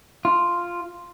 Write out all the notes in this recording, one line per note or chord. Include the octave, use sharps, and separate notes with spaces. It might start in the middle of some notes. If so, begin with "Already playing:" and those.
F4